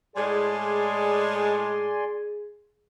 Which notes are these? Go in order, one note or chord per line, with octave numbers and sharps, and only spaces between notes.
A2 G#3 G#4 D5 G#5 C6